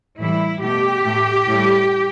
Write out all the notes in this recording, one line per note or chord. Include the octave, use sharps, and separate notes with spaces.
A2 E3 G3 E4
B2 A3 G4
A2 A3
A2 G3